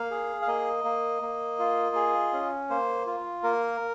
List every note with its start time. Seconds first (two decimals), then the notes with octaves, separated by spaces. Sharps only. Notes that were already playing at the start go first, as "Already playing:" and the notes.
Already playing: A#3 F5
0.11 G#4
0.42 F5
0.47 A#3 D#5
0.84 A#3
1.22 A#3
1.59 F4
1.96 G#4
2.33 C#4
2.70 A#3 C5
3.06 F4
3.43 A#3 A#4